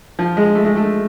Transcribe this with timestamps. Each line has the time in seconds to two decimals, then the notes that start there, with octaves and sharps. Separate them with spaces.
0.19 F3
0.37 G#3
0.55 A3
0.65 G#3
0.76 A3